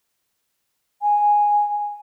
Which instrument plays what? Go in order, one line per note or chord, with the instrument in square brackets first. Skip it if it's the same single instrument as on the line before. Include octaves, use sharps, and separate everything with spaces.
[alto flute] G#5